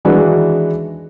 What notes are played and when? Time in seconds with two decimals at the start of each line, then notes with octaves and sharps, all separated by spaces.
0.05 D#3 E3 G#3 D4 F#4 B4